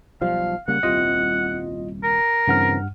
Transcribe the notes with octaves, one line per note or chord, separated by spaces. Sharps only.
B1 F3 G3 F5
C#3 G3 A#3 F#5
D#1 C2 C3 F4 D#5
A#4
G2 C#3 E3 C4 F#5 F6